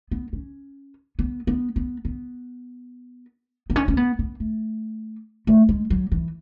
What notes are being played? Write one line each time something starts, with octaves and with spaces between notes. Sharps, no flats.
B3
C#4
B3
B3
B3
B3
B3
C#4
C#4
B3
B3
A3
A3
G#3
F#3
E3